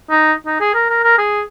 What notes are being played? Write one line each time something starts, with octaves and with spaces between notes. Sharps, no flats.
D#4
D#4
G#4
A#4
A#4
A#4
G#4